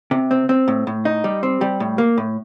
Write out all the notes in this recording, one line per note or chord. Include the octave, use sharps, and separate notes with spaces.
C3
C4
C4
A2
A2
D#4
G3
C4
G3
A2
A#3
A2